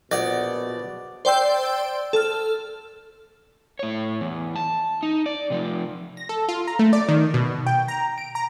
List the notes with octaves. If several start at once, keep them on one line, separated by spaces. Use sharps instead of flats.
A#1 B2 D5 D#5 F#5
C5 D5 G5 C6 E6 G6
A4 F6
A2 C#5
E2
A5
D#4
D5
C3 F3
A#6
A4
F4
A#5
A3
D5
D#3
B2
G5
A#5
D7
A#5